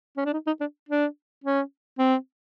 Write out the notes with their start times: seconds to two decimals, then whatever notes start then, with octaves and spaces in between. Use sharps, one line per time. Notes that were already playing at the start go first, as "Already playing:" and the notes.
0.17 C#4
0.25 D4
0.33 D#4
0.47 D#4
0.60 D4
0.89 D4
1.44 C#4
1.99 C4